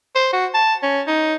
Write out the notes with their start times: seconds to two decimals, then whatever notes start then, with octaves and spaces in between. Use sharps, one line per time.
0.15 C5
0.33 F#4
0.54 A5
0.83 C#4
1.07 D#4